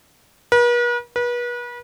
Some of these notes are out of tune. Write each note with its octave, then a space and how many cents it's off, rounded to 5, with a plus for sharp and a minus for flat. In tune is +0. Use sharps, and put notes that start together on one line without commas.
B4 -45
B4 -35